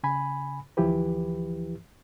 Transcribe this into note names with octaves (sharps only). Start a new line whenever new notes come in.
C#3 G#5 B5
D2 E3 F3 E4 G4 B4